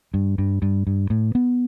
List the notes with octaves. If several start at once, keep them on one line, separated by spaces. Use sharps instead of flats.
G2
G2
G2
G2
A2
B3